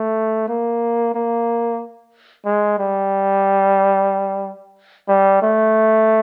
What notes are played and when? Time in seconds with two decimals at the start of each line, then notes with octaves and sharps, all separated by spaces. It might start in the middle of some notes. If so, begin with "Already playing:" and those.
Already playing: A3
0.48 A#3
1.14 A#3
2.46 G#3
2.78 G3
5.08 G3
5.42 A3